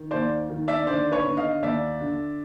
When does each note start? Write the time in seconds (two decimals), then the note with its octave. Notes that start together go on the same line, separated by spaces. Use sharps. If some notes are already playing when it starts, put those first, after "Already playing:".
Already playing: D#3
0.11 D#2 C5 D5
0.50 D#3
0.68 D5 E5
0.87 D3 C5 D5
1.12 B4 C#5
1.24 D3
1.37 D#5 F5
1.62 D#2 D5 E5
2.01 D3